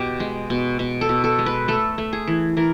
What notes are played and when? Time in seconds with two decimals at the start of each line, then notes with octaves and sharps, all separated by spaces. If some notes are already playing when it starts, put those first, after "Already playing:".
Already playing: B2 G4
0.20 G#3
0.50 B2
0.79 B2
1.01 A4
1.09 B2
1.24 A4
1.39 G#3
1.46 B4
1.68 A3 A4
1.98 A3
2.13 G#4
2.28 E3
2.57 E3 A#4